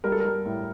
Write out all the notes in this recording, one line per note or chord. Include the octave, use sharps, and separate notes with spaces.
G3 A#4
A4
G3 A#4
A2